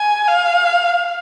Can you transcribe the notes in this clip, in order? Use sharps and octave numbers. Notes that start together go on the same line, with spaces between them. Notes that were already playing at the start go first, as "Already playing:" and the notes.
Already playing: G#5
F5